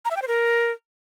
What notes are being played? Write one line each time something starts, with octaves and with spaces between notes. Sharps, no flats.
A#5
E5
G5
C5
A#4